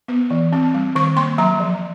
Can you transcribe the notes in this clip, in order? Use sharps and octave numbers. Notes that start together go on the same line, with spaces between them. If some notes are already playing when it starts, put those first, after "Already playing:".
B3
E3
C4
G3
D#3 C#6
A#3 C6
F#3 A#5
F3